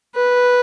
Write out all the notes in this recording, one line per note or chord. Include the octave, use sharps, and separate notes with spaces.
B4